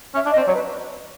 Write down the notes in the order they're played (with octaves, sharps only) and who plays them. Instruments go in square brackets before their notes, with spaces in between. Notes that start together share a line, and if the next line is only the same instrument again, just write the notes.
[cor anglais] C#4 [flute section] E5
[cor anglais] D4
[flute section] D#5
[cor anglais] C4
[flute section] D5
[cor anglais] F#3 [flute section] C#5
[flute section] B4